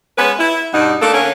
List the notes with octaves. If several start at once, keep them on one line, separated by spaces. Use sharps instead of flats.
G#3 B3 C#4 B4
E4
G2 B2 D4 D#4 F#5
A3 A#3 D4 A4
D3 A#3 C#4